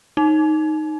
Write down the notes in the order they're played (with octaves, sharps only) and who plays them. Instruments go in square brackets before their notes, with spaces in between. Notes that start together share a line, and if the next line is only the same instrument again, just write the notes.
[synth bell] D#4